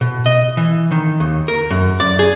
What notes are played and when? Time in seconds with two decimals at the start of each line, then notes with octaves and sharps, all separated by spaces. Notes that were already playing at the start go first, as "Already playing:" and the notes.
0.01 B2
0.26 D#5
0.57 E3
0.91 D#3
1.20 D#2
1.48 A#4
1.71 F#2
2.00 D5
2.19 G#4